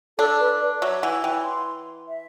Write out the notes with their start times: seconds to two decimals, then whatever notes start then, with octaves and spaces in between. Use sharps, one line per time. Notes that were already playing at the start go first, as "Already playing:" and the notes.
0.18 D4 A4
0.40 B4
0.60 D5
0.81 F#3 E5
1.02 E3 F#5
1.23 E3 G5
1.44 C6
2.08 E5